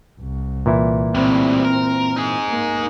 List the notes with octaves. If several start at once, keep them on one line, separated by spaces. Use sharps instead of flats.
C2
A#2 E3 E4
A2 G3 C4
A#4
D#4 G#4
A#3